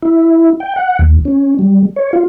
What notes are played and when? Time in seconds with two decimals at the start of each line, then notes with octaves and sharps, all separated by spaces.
0.03 E4
0.60 G5
0.76 F#5
0.99 D#2
1.25 C#4
1.59 G3
1.96 C#5
2.13 F4